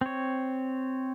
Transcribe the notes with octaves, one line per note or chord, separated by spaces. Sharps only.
C4 C#5